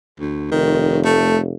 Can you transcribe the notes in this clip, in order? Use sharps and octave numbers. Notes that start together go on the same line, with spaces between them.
D2
F1 D#3
A3